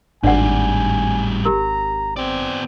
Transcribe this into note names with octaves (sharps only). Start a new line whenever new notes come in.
G#1 A2 G3 D4 D5 F#5 G#5
G4 A#4 A#5
B3 C4 D5